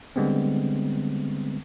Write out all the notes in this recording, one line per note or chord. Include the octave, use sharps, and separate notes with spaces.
D3 G3 G#3 B3 C4